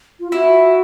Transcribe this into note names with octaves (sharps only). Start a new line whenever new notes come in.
F4
E4 F#4